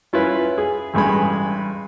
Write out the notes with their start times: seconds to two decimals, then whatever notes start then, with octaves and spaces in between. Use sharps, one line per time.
0.13 C#4 E4 F4 B4
0.58 G#4
0.94 A1 G2 G#3 G#4 B5